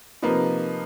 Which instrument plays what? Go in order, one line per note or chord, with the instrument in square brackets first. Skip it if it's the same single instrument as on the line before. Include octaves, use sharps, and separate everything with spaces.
[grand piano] C3 F3 A#3 D#4 B4